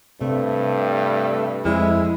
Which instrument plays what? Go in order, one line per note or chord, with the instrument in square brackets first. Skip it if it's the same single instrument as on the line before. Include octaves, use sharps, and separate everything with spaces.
[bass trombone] G2 [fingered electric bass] C3 [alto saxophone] A3
[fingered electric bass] F2 [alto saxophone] G#3 [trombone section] E4